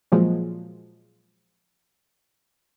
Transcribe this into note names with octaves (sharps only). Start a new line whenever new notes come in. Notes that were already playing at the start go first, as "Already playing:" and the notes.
A#2 F3 F#3 G#3